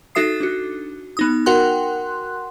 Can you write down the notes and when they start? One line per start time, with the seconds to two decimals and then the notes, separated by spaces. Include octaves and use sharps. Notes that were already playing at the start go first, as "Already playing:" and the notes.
0.15 D#4 F#4 A4 E5 D#6 C7
0.40 D4 F#4
1.17 B3 D#4 D#6
1.46 F#4 A#4 F#5 G5 C6 F#6